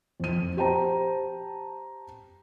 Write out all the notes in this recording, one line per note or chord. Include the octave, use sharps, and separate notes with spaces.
F2 D#7
G4 C5 G5 A5 A#5